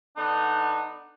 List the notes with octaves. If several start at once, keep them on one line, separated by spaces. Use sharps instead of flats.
D3 B3 D4 D#4